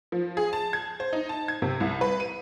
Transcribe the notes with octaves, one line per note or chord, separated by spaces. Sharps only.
F3
G#4
A5
G#6
C5
D#4
A5
G#6
C3
C2
B4
D#7